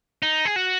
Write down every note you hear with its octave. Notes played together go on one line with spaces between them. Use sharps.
D#4
G#4
F#4